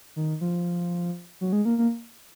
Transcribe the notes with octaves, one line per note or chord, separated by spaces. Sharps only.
D#3
F3
F#3
G#3
A#3
A#3